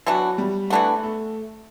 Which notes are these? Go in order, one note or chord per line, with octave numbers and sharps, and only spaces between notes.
E3 F#3 B3 D4 F#4
G3
E3 A3 B3 D4 F#4
A3